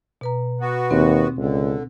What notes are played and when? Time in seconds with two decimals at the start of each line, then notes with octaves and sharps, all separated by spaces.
0.21 B2 B4 A#5
0.60 B3 F#4
0.91 D#2 C4
1.38 C#2 D3